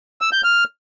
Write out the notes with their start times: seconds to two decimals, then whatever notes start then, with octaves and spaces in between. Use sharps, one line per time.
0.21 E6
0.33 G6
0.44 F6